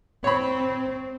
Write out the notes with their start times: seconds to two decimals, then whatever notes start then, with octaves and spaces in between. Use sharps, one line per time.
0.24 C4 C#5 B5